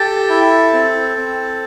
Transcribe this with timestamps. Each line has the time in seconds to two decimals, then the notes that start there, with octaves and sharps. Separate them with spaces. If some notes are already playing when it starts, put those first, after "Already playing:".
Already playing: G4 A4
0.29 E4
0.73 C4
1.16 C4